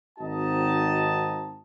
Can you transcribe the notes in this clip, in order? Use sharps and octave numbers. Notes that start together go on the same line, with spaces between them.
G#1 C4 D#4 F#4 D#5 A5